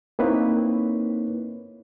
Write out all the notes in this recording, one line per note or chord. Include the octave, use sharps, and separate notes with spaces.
A#3 C4 D#4 E4 B4 C#5